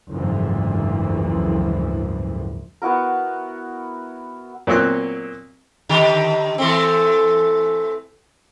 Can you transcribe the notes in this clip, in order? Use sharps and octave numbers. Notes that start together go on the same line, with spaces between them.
F#1 D2 G#2 E3 F3
B3 E4 F#4 A#4
A#2 F#3 B3 C4 E6 F#6
D3 D#3 G4
E3 A3 C4